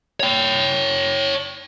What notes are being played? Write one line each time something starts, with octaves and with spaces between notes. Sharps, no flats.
C#5 G5